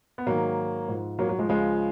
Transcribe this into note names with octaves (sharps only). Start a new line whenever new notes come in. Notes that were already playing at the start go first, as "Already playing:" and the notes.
B3
G#2 D#3 F#3 A#3
G#2 F3
F#3 A#3
F#3
F3 G#3
C#2 C#3 F3 G#3